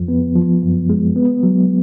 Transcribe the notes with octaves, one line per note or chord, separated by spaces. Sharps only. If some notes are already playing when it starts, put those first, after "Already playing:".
Already playing: F2 F3
B3
F3
F#2
G#3
B3
F#3